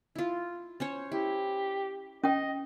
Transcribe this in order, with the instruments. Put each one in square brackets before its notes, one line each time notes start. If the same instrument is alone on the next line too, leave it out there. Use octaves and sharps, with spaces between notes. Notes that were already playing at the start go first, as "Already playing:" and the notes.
[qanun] E4 F4
C#4 C5 C#5
[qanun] E4 [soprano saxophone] G4
[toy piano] C#4 G5 [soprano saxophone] D#5